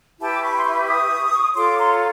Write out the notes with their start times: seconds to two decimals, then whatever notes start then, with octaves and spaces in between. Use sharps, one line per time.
0.19 E4 G4 B4 G5 A5
0.33 D6
0.42 B5 C#6
0.57 C6
0.65 B5 C#6
0.87 C#6 D#6
1.55 F4 A4 C#5 C6 D6
1.78 A#5 C6
1.94 A#5